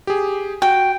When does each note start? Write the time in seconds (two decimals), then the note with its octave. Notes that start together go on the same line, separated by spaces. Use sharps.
0.07 G4 G#4
0.62 F#4 G5